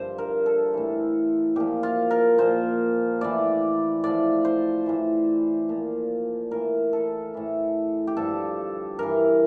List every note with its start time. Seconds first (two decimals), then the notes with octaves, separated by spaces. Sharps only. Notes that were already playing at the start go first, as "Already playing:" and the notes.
Already playing: G2 D3 F3 C5
0.18 A#4
0.46 A4
0.74 A2 E3
1.56 A#2 F3 G4
1.83 F4
2.11 A#4
2.38 A#2 F3 C5
3.21 A2 E3 D5
4.04 A2 F3 D5
4.45 C5
4.86 A2 E3
5.69 A#2 F3
6.51 A2 E3 A#4
6.93 A4
7.34 A2 E3
8.07 G4
8.16 G2 D3 F3 A4
8.99 G2 E3 A#4